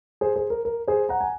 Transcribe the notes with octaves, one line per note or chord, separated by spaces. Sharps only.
G#4 C5
G#4 C5
A#4
A#4
G#4 C5
F#5 A#5
G#5